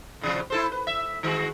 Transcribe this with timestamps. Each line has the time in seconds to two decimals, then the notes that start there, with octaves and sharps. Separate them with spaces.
0.21 A2 C3 F3
0.50 E4 A4 C5
0.72 B4
0.87 E5
1.23 D#3 G#3 F#4